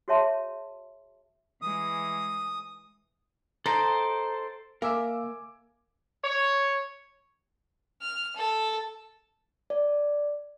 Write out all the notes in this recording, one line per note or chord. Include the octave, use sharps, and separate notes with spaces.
F#4 G#4 C#5 E5 A5 C6
E3 G#3 D#6
D#4 A4 C5 G5
A#3 A#4 E5 F5 G#5 D6 E6
C#5
F6
A4
D5